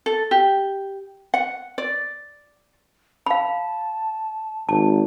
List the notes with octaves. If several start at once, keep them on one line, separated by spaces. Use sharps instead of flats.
A4
G4
F#5
D5
F5 A5 B5
G#1 A5